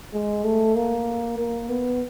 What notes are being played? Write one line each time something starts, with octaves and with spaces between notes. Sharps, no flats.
G#3
A3
A#3
A#3
B3